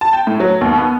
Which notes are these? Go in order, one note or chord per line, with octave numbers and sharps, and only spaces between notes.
A5
G5
A2
F#3
D#2
B3